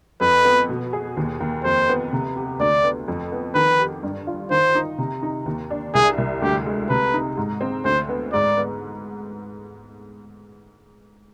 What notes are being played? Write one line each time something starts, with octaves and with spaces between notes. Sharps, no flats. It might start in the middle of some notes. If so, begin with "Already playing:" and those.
F2 B4
B3
B2
G#4
D#2
D#2
F2 C5
B3
C3
G4
D2 D5
B3
F2
B3
D#3 B4
G4
G2
F4
D#3 C5
D#4
C3
D#4
D#2
D4
C2 G#4
C2
D2 G4
G#3
C3 B4
D#4
G#2
C4
D2 C5
B3
G#2 D5
B3